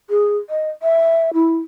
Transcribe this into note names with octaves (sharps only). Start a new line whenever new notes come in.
G#4
D#5
E5
E4